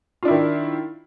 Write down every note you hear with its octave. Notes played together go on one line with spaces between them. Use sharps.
D#3 D4 E4 F4